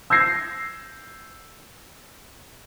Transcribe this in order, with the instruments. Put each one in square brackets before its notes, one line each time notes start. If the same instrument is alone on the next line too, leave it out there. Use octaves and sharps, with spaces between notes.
[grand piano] E6 G6 G#6 A#6 C7